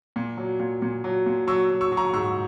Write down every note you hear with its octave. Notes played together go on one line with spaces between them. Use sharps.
A#2
F#3
A#2
A#2
F#3
A#2
F#3 C#6 E6
F#3
C#6 E6
F#3
A#5 C#6
G#2 C#6 E6